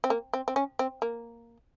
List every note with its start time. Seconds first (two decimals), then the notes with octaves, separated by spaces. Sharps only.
0.04 C4
0.10 A#3
0.33 C4
0.48 C4
0.56 C#4
0.79 C4
1.02 A#3